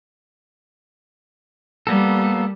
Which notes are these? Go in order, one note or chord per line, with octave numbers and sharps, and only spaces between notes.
G3 A#3 B3 A4